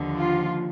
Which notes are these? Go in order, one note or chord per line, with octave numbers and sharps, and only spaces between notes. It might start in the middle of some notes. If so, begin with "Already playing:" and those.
Already playing: D#2 D3 F3
F4